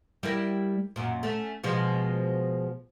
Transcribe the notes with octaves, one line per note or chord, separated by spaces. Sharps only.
G3 E4 A#4
F#2 A#2
A3 C#4
B2 F3 G#3